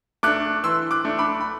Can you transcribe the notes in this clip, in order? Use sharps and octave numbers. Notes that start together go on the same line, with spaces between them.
A3 D4 D6 F#6
E3 C6 E6
D6 F#6
A3 D4
B5 D6
B5